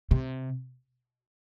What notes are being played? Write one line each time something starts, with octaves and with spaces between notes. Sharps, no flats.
C3